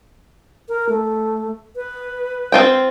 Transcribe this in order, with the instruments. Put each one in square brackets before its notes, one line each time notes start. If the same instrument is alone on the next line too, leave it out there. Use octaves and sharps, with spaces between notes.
[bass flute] A#4
A3
B4
[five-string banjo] C4 F4 G5